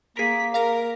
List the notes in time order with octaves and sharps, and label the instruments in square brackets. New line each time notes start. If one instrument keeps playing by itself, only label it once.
[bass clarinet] A#3 [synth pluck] G#4 A#4 [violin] B6
[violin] A#4 [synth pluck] F5 A#5 A#6